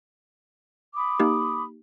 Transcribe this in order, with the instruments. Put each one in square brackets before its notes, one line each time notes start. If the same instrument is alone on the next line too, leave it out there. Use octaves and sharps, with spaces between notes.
[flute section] B5 D6 D#6
[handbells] A#3 D#4 G4